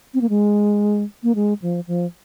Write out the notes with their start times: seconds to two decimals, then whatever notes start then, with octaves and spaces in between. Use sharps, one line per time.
0.14 C4
0.21 A#3
0.29 G#3
1.23 A#3
1.35 G#3
1.62 F3
1.87 F3